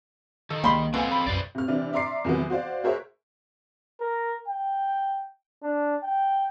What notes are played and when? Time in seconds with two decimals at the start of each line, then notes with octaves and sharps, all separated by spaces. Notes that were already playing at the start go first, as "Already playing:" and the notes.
0.50 D#3 A4
0.64 C2 G3 G#3 A#3 B5 C6
0.94 B2 C4 A4 F5 G#5
1.11 B5
1.27 B1 F#2 B4 C5 D5
1.55 C3 F6
1.68 C3 E3 D4
1.93 D5 E5 A#5 C6 D6 C7
2.25 E2 C3 D#3 F3 F#3 B3
2.50 F#4 C5 D5 F5
2.84 F#4 G#4 A#4 C5 C#5 E5
4.01 A#4
4.48 G5
5.63 D4
6.04 G5